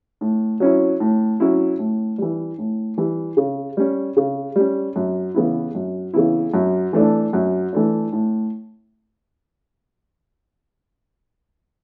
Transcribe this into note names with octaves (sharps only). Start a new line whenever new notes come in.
A2
F#3 C#4 E4
A2
F#3 C#4 E4
A2
E3 G3
A2
E3 G3
C#3
G3 C#4
C#3
G3 C#4
F#2
C#3 E3 B3 E4
F#2
C#3 E3 B3 E4
F#2
E3 A3 D4
F#2
E3 A3 D4
A2